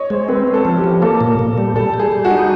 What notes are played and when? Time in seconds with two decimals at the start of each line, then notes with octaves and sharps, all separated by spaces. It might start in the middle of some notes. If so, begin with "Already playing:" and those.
Already playing: C#5 D#5
0.10 G#3 C5
0.28 C4 B4
0.47 C4
0.54 A4
0.65 F3
0.78 G4
0.84 F3
1.02 A#3 A4
1.21 A#2
1.39 A#2
1.58 G3
1.76 G3 A4
1.94 G3
1.99 G#4
2.12 G3
2.24 F#4
2.31 D#4